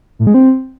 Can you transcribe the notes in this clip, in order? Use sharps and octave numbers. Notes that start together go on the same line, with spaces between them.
A2
G#3
C4